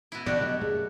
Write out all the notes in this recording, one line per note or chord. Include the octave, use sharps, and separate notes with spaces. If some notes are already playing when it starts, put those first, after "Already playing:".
B2 E4
B2 D3 F3 D4 F#4 G4 D5
B2 F#3 A3 D#5
F#2 A3 G#4